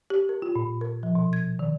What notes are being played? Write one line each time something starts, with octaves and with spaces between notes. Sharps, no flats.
G4
A#4
F4
A#2
A#4
F3
B2
G#6
D#3